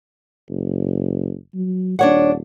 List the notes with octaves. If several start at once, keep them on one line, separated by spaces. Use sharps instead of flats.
F#1
F#3
D#1 D4 C#5 F#5